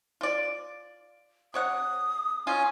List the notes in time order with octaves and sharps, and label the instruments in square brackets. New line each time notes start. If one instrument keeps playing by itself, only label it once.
[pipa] F4 D5
[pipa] C3 C#5 F#5 [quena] D#6
[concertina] C#4 G#5 [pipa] F4